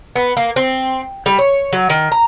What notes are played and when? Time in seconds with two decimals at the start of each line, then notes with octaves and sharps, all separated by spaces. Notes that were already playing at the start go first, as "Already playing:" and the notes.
0.16 B3
0.37 A#3
0.56 C4
1.26 G3
1.39 C#5
1.73 F#3
1.90 D#3
2.12 A#5